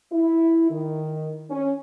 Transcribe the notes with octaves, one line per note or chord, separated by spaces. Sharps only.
E4
D#3
C#4